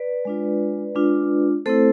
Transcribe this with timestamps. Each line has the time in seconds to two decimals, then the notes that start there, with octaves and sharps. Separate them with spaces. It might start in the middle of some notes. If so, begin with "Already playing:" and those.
Already playing: B4 D5
0.25 G#3 D4 F4
0.95 G#3 D4 F4
1.66 A3 C4 E4 A4 C5